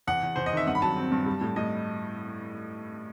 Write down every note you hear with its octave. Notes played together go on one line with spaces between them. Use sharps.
E2 F#5
E2
E2 C5
D#5
D#3 E5
G2 F#5
B5
F#3 A5
C4
G2
G3
A2
A2 D#5